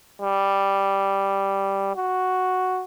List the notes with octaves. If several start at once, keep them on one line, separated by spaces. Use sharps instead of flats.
G3
F#4